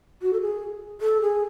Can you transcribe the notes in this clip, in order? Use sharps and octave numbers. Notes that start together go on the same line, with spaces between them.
F#4
A4
G#4
A4
G#4